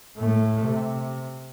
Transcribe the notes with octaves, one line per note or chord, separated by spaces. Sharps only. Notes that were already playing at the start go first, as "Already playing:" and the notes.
A2 A3
C3